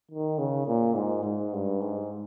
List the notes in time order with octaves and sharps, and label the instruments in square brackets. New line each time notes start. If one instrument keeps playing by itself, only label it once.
[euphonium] D#3
C#3
A#2
G#2
G#2
G2
G#2